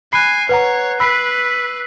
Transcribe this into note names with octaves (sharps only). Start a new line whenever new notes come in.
G#5 B5 F#6 C7
B4 C#5 F#5 A#5
B4 B5 E6 B6 C7